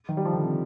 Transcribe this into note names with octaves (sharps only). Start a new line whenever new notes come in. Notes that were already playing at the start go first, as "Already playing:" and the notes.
D#3
G3
F3
D3
C3